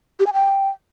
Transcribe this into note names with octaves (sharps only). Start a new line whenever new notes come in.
G4
G#5
G5